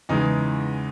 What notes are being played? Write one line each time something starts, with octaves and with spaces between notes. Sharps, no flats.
E2 C#3 E3 G#3 D#4